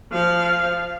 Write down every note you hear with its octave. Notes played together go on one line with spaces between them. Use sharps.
F3 F5